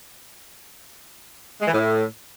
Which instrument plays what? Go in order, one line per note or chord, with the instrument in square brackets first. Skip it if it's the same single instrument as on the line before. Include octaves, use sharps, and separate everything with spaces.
[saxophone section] G#3
E3
A2